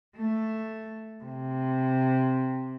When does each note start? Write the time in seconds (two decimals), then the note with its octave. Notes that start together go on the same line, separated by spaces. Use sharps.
0.16 A3
1.24 C3